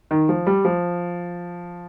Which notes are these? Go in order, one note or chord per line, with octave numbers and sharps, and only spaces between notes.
D#3
F3
G3
F3